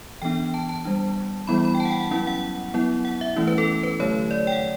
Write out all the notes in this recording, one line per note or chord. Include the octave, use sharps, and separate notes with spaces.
E3 B3 D4 G5
A5
A5
G3 D4
E3 G3 B3 E4 B5
B5
G5
A5
F#5
G5
F#5
F#3 C#4 E4 F#5
F#5
F#3 B3 E4
F#5
E5
E3 A3 C#4 E4
B4
A4
B4
D3 F#3 A3 C#5
D5
G5
F#5